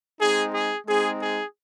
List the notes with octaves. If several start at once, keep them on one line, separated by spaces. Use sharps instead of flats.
G#3 C4 D#4 G#4
G#4
G#3 C4 D#4 G#4
G#4